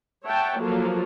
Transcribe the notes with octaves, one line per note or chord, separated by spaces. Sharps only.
C#5 E5 F#5 G5 A5
F3 F#3 A#3 F4 A4